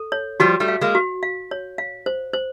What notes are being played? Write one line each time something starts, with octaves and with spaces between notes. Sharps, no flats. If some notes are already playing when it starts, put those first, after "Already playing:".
Already playing: A4
C#5
F3 G3 F#4
G3 A3
F5
G#3 A#3
F#4
F5
C#5
F5
C5
C5